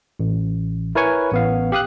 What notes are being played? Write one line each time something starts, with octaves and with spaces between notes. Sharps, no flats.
A1
E4 A#4 B4 C#5 G#5 C#6
A1 B3 F5
G4 F5 D#6 F#6